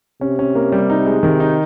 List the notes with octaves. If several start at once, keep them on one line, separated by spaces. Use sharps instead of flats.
C3 C#4
C#4
A#3
G3
D#4
G#3
C3 D#3
D#4